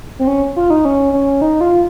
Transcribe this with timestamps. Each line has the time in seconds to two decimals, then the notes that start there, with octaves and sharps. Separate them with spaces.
0.19 C4
0.27 C#4
0.56 F4
0.70 D#4
0.85 C#4
1.13 C#4
1.42 D#4
1.61 F4